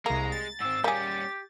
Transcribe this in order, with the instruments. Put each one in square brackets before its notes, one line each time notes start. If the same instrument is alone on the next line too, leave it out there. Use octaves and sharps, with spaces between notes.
[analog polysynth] C2 A#5 [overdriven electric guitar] G#3 [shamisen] A#3
[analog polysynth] A6
[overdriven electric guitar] G#2 C4 [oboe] E6
[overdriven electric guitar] G3 C#4 [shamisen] A#3 G#4 [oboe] G4